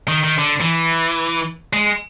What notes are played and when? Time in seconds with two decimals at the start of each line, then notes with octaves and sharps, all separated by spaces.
0.08 D#3
0.24 D#3
0.38 D3
0.61 E3
1.73 G#3